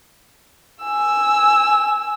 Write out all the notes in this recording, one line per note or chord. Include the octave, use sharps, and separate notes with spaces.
G#5 E6